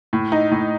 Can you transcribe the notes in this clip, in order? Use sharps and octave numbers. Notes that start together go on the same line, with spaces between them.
A2
D#4
A2